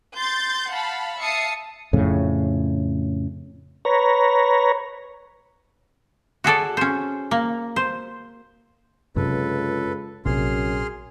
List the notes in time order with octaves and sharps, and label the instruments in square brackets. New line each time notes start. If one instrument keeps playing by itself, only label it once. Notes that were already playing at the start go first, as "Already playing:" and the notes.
[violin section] C6 G6 A6
F5 F#5 A5 B5
E5 F5 A5 D#6 C7 C#7
[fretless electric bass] F2 A2 C#3
[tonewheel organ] B4 C#5 A#5
[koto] F#4 G#4 A4 D5
C#4 C5
A#3
C5
[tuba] C#2 [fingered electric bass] F#2 C3 [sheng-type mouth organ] A4 B4
[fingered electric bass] A#1 C3 [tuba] F#2 [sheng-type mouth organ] G#4 C6 F6